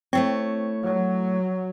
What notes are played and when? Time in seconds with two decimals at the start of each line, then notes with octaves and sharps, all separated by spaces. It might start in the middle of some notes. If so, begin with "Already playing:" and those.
0.13 A3 C4 E4 C#5
0.84 F#3